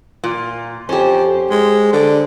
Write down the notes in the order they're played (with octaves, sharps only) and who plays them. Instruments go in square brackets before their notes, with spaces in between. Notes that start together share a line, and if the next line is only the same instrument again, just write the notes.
[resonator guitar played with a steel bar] A#2 [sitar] F4
[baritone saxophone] F2 [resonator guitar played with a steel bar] C#4 G4 [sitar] C5
[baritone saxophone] G#3
[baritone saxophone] D3 [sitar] G3 D5